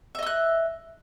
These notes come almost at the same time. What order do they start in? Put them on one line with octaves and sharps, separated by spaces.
E5 D#5 E6 F#6